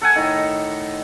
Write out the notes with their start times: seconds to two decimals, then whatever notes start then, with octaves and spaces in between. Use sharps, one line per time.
0.02 A4 F#5 G#5
0.16 A2 D#3